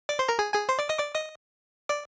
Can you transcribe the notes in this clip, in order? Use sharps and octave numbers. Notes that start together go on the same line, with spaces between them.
D5 D6
C5 C6
A#4 A#5
G#4 G#5
G#4 G#5
C5 C6
D5 D6
D#5 D#6
D5 D6
D#5 D#6
D5 D6